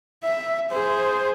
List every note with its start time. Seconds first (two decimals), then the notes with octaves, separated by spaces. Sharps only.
0.24 E5
0.71 G#4 C5